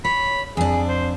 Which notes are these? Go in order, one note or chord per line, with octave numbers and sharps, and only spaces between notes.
C#5 B5
F2 D4 G#4
C5